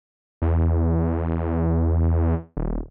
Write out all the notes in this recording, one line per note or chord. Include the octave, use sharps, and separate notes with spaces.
E2
D#1